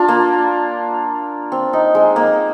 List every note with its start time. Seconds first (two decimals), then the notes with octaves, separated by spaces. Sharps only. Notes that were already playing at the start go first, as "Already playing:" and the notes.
Already playing: D4 F4
0.08 A#3
1.52 C4
1.73 D#4
1.95 G#3
2.16 A#3